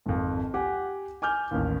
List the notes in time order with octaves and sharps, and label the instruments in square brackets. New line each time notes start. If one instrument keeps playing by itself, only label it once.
[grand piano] G#1 F2
G4 F#5 G#5
G#5 D6 F6 G6
A1 D#2